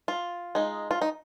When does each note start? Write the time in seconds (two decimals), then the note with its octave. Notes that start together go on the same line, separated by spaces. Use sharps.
0.08 F4
0.55 G#3 D#4
0.91 F4
1.02 D#4